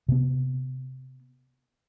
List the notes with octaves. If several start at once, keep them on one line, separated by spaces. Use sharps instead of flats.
C3 B3